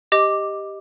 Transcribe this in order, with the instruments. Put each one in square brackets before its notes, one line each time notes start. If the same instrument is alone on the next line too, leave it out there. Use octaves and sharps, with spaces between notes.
[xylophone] G4 D#5 D6